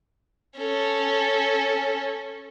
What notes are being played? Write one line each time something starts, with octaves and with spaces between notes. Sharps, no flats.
C#4 A4